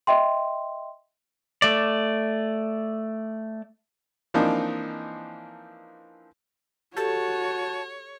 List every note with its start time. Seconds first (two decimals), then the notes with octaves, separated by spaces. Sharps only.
0.07 D#5 E5 G5 C6
1.62 A3 D5
4.34 E3 F3 A#3 C4 D4 D#4
6.97 F#4 G4 A4 C#5 A5